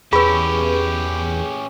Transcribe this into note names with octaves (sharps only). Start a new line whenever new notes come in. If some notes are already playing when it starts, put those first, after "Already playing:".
E2 C#4 G4 G#4 B4 B5